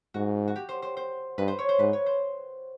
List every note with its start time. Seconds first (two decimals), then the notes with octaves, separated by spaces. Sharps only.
0.14 G#2 F#4
0.48 F#4
0.56 G4
0.69 C5
0.82 C5
0.97 C5
1.38 G2 B4
1.48 C5
1.59 C#5
1.69 C5
1.79 G#2 B4
1.93 C#5
2.06 C5